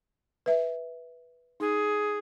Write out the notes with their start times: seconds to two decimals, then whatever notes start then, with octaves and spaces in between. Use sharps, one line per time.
0.46 B4 E5
1.60 D#4 G#4